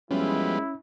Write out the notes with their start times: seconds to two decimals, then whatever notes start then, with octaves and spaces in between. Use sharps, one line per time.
0.11 F#2 F3 G3 G#3 B3 C#4 E4